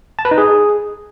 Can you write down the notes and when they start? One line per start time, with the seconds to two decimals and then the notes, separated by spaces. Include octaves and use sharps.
0.19 A5
0.25 B4
0.31 D#4
0.38 G#4